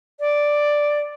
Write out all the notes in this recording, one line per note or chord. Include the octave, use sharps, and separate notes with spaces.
D5